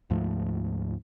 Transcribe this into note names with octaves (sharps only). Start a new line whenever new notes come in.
D2 G#2 F3 A3